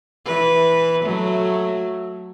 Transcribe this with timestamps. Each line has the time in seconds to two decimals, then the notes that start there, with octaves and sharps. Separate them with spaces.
0.25 E3 B4
1.03 F#3 A3